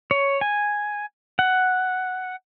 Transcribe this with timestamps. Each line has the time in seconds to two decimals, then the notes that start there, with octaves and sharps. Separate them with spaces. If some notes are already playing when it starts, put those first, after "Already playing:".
0.11 C#5
0.41 G#5
1.39 F#5